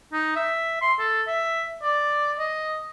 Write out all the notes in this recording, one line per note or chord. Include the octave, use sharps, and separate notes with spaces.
D#4
E5
C6
A4
E5
D5
D#5